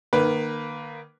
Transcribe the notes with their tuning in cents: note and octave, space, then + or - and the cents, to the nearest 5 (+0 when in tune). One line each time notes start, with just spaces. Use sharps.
D#3 -35 A#3 +0 B4 +0